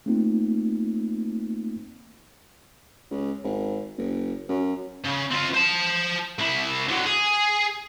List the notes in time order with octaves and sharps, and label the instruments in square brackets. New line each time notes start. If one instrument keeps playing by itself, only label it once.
[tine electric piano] A3 A#3 C4 D#4 F4
[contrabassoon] C#2
G#1
F#1
F#2
[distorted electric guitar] C#3
C4 F4
C5 A5
C2 E4
D3 F#3
G#4